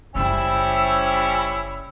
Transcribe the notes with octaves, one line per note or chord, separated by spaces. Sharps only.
F#1 G3 C#4 E4 F4 C5 G5 E6